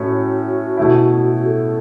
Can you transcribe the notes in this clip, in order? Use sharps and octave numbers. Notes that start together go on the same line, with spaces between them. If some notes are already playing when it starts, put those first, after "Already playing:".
Already playing: A2 A3 C#4 F#4
B2 A3 E4
F#4
A4